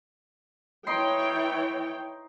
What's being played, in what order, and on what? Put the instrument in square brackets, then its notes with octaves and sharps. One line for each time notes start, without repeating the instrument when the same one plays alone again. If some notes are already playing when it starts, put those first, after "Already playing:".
[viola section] E3 C#5 G5 [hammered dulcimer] D#4 C6